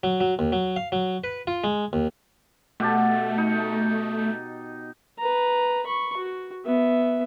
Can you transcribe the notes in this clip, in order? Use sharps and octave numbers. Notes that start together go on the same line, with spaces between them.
F#3
F#3
D#2
F#3
F5
F#3
B4
F4
G#3
D#2
B2 A3 G4 A5
D#4
B4 A#5
B5 C#6
F#4
B3 E5